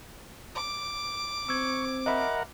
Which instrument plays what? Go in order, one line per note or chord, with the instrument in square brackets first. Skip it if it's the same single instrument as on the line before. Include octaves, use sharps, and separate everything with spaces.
[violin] D6
[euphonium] C4 [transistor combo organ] C#6 [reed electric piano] E6 G#6
[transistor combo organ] A#4 F#5 [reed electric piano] D#5 E5 B5